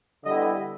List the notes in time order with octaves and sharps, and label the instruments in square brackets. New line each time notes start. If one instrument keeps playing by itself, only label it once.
[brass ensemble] D3 G3 B3 E4 D#5